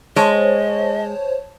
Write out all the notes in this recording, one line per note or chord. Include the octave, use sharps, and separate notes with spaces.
G#3 C5 C#5 D#5 A5